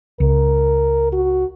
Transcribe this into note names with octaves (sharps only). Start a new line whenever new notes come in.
C#2 A#4
F#4